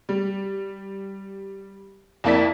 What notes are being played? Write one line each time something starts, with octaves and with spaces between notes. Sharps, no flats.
G3
F2 A#3 E4 D5 B6